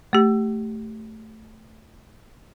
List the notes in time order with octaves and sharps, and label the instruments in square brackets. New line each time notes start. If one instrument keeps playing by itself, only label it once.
[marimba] A3 G4